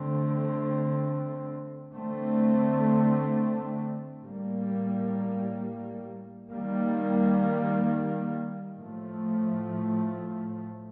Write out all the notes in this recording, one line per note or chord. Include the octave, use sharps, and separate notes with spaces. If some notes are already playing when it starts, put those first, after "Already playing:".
Already playing: D3 A3 C4
D3 A3 C4
A2 G3 A#3
D#3 G3 A#3
A2 F3 A3